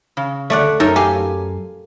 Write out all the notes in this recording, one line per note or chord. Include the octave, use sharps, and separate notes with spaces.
C#3
D2 A3 C#5 D5 F#5
F#2 D#4 A4 A#4 C#5 E5
G4 F5 G#5